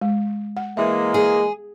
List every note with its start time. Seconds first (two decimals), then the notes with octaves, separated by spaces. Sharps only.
0.01 G#3
0.57 F#5
0.77 E3 G#3 A#3 E5
1.14 G#4